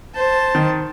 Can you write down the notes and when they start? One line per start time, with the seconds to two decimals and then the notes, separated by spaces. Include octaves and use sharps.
0.15 C5 A5
0.55 D#3